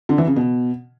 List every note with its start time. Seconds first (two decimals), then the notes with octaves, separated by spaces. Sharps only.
0.09 D3
0.18 E3
0.27 C#3
0.36 B2